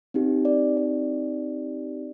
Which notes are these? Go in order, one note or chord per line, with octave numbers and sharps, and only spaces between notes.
C4 D#4 G4
D5
D5